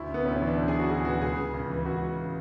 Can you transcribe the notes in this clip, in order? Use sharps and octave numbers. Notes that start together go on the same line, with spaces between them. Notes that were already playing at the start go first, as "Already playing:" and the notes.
Already playing: D2 E4
C#3 B3
D2 C#4
C#4
E3
D4
D2
G#4
C#3
F#4
D2 G#4
E3 F#4
C#2 G#4
C#3
C#2
E3
C#2 F#4
C#3